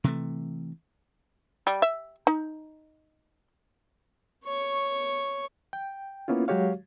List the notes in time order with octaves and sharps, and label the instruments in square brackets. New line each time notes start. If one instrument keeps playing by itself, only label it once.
[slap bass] C3 E3 A3
[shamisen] G3
E5
D#4
[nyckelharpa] C#5 C#6
[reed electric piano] G5
A#3 B3 C#4 E4 F4
F#3 G#3 F#4 G4 C#5 F5